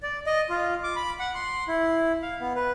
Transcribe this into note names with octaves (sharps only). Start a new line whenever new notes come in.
D5
D#5
F4
D6
B5
F#5
C6
E4
F5
B3
B4